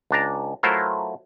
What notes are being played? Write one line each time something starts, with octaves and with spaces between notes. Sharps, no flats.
C#2 D4 A#5
F#3 A3 E4 F4 A#4 C5